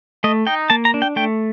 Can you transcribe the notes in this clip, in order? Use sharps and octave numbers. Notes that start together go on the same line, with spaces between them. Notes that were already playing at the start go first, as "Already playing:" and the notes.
A3 D#5
D#4 G5
A#3 A5
A#5
D4
G5
A3 G5